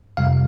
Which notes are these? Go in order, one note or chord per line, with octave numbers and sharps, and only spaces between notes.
F2 C3 G3 F5